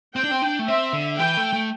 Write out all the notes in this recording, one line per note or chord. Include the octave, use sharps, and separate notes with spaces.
C4 G5
D4
C4
D4
A3
C4 E5
D3
E3 G5
A3
A3